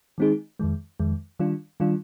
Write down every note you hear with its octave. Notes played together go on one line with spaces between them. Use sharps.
D#3 G#3 C4 D#4 G#4
F2 D#3 G#3
F2 D#3 G#3
D#3 G3 D4 F4
D#3 G3 D4 F4